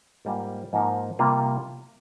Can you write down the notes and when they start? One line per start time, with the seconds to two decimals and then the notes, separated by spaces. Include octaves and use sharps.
0.25 G#2 G3 A#3 F4
0.73 G#2 F3 A#3 D#4
1.19 C3 G3 A#3 F4